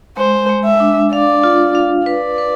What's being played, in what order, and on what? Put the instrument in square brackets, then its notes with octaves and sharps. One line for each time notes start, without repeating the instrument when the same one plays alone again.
[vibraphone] G#3 [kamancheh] C5
[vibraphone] G#3
[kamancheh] E5
[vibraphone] D4
[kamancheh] D5 [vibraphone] F5
[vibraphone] F4
F5
[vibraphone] B4 [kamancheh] D5
[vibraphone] B4